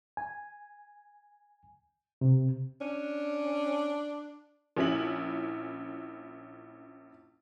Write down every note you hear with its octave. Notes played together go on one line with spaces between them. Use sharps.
G#5
C3
C#4 D4
A#1 C#4 E4 F#7